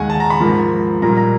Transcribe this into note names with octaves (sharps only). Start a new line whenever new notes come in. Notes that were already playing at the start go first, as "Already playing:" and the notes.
Already playing: D#2 D#3 G#3 F#5 G#5
A5
A#5
B5
G#2 F3 A#3
A#2 G3 A#3 A#5
A#5